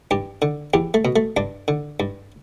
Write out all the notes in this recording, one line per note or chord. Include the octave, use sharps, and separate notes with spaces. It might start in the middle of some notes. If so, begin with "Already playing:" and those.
G2 G4
D3
E2 G4
A3
B2
A3
G2 D4
D3
G2